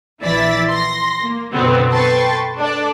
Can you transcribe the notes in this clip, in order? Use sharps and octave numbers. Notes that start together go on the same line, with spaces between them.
A#1 E3 E4 D5 A6 B6
C6 A#6
A#3
F#2 B2 D3 B3 C4
A4 B4 G5 C6 C#6 A6
D4 A4 D5